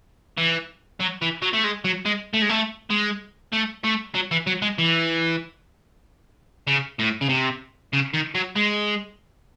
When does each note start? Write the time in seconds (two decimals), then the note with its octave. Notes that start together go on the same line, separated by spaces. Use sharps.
0.37 E3
1.00 F#3
1.22 E3
1.42 F#3
1.54 A3
1.64 G#3
1.85 F#3
2.05 G#3
2.34 A3
2.42 G#3
2.49 A3
2.90 G#3
3.53 A3
3.84 A3
4.15 F#3
4.31 E3
4.47 F#3
4.62 G#3
4.78 E3
6.67 C#3
6.99 A2
7.21 C#3
7.29 C3
7.93 C#3
8.14 D#3
8.35 F#3
8.56 G#3